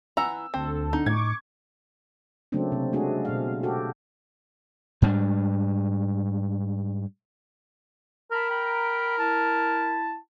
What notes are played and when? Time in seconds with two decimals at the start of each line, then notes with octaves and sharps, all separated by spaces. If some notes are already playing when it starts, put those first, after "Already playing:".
0.17 E3 F#5 A#5 E6
0.54 D2 C4 A4
0.93 D3 D#4
1.06 A2 C#6 D6 G#6
2.52 C#3 F#3 A3 A#3 C4 D4
2.72 C3
2.93 G#3 A3 C4 D4 F#4 G#4
3.25 B2 F5
3.63 F#4 G4 A4
5.02 G#2 G3 C4 D4
8.32 A#4 A5 B5
8.49 G5 A#5 B5
9.18 E4 A5